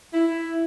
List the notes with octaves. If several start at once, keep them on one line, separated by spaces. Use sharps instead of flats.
E4